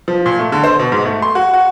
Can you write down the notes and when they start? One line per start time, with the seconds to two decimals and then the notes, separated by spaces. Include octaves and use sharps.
0.08 F3
0.26 A#2
0.39 A3
0.52 D3
0.64 C5
0.79 B2
0.92 G#2
1.06 A3
1.22 C6
1.35 F#4
1.54 F#4